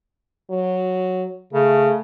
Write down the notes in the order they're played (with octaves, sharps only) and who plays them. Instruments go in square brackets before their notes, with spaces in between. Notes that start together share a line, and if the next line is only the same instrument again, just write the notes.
[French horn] F#3
[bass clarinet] C#3 [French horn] A3